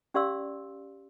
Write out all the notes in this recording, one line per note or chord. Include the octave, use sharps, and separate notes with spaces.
C#4 G4 D5 F5 C6 E6